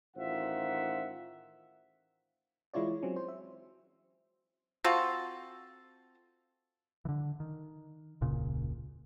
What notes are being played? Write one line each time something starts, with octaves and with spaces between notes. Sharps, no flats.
A1 D#3 F4 C5 E5 F#5
E3 G#3 E4 F4 C#5 D5
F#3 C4 C#4
C5
E5
C4 F4 F#4 A4
D3 E3
D#3
E1 C#2 A#2 C#3